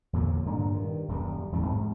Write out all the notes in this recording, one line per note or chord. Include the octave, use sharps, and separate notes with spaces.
E2 A#2 D3 F#3
G2 A#2 D3 D4
G2 D#3
D#1 F#2 G3
E2 G#2 F3 C4
G#2 G3